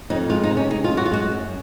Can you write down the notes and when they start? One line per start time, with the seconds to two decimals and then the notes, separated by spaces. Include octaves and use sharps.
0.10 F2 D#4
0.30 G#3 F4
0.43 D#4
0.50 C3
0.57 C#4
0.70 G#3 D#4
0.84 F4
0.91 F#2
0.97 F#4
1.06 F4
1.11 G#3 F#4
1.31 F#2